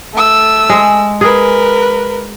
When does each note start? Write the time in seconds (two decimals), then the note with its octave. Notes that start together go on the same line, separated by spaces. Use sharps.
0.14 A3 E6
0.70 G#3
1.21 G#4 A#4 B4